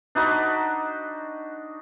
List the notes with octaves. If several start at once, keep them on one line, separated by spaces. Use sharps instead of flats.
D4 D#4 F#4 B5